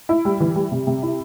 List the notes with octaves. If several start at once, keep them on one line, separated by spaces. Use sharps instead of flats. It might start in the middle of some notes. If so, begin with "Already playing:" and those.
E4
G3
E3
G3
C3
C3
E4